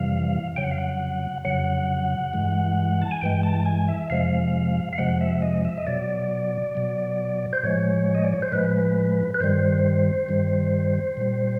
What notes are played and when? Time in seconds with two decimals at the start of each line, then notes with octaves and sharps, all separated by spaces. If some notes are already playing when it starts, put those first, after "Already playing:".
Already playing: F2 C3 E3 G3 F5
0.56 F2 C#3 F#3 G5
0.64 F#5
0.71 F5
0.78 F#5
1.45 F2 C#3 F#3 F#5
2.33 G2 E3 G#3
3.02 A5
3.11 G#5
3.21 G2 E3 G#3 G5
3.43 A5
3.66 G#5
3.88 E5
4.10 F2 C3 F3 G#3 F5
4.93 F5
4.98 F2 C3 F3 G#3 F#5
5.21 E5
5.42 D#5
5.65 E5
5.78 D#5
5.87 B2 F#3 D5
6.75 B2 F#3
7.53 C5
7.63 A2 F3 G#3 C#5
8.15 D#5
8.24 D5
8.33 C#5
8.42 C5
8.52 A2 F3 G#3 B4
9.34 B4
9.40 G2 D#3 G3 C5
10.29 G2 D#3 G3
11.17 A#2 G3